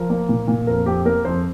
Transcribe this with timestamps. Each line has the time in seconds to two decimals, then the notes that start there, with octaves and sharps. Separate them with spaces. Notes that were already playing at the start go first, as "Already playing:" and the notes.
Already playing: F3 A#4
0.10 A#3
0.29 A#2
0.48 A#2
0.67 F2 A#4
0.86 F2 G4
1.05 A#3 A#4
1.25 F2 C5